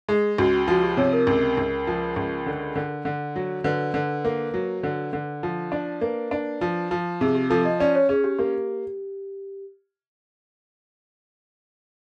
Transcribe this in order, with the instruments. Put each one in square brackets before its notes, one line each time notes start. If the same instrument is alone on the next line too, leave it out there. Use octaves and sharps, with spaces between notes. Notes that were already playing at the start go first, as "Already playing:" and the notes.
[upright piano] G#3 [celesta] G#4
[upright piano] C#2 [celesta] F#4
[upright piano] F3 [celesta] F#4
[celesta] G4
[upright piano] C3 [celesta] C#5
[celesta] A#4
[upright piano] C#2 [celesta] A#4
[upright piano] C#2
F3
C#2
D3
D3
D3
F#3
[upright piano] D3 [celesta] B4
[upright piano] D3
A#3
F#3
D3
D3
F3
D4
[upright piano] A#3 [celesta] B4
[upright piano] D4
F3
F3
[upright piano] C3 [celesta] G#4
[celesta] G4
[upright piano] F3 [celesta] A4
[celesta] D#5
[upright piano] C#4 [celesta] D5
[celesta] C#5
[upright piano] C#4 [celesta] G#4
[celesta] G4
[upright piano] A#3 [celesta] G4